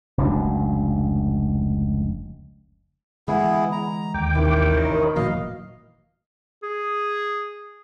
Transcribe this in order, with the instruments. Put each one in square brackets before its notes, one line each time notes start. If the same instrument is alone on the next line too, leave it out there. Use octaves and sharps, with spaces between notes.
[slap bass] F1 C#2 F#3 D4
[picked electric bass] D3 E3 G#3 [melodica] B3 E4 G#4
[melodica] A#5
[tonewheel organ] D#2 G5 D6
[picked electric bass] E1 A1 C3 [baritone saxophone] D#3 [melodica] E4
[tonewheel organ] A#4 C#5 D#5
[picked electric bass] F1 D#3 E3 [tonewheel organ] A#2 F#3 [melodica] D#5 F5
[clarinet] G#4